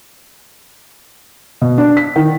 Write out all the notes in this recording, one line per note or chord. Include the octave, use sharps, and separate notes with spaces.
B2
D4
B6
D#3